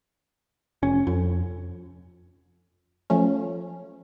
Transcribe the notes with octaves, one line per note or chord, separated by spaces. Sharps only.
F1 C#4
F2
F3 A3 C#4